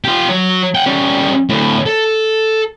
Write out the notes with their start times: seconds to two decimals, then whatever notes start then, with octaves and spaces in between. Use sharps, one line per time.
0.05 F4 G4
0.29 F#3
0.75 F#5 G5
0.86 G3 C#4
1.49 D2 A2
1.86 A4